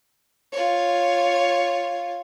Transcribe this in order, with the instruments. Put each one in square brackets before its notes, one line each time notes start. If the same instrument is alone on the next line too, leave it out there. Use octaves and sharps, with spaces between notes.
[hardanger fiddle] F4 C#5